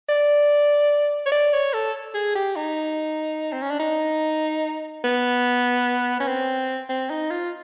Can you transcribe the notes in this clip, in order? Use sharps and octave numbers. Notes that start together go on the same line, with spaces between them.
D5
C#5
D5
C#5
A4
G#4
G4
D#4
C4
C#4
D4
D#4
B3
C#4
C4
C4
D#4
F4